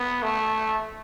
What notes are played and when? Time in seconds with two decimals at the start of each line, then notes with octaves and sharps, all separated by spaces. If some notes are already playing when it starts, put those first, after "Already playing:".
Already playing: B3
0.22 A3